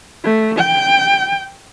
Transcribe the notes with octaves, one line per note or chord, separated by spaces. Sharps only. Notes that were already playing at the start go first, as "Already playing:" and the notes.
A3
G5